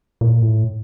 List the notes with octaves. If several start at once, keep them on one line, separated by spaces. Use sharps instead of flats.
A#2
A2